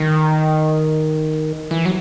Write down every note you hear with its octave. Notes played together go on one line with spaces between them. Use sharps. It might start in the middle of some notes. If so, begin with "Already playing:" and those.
Already playing: D#3
E3
F#3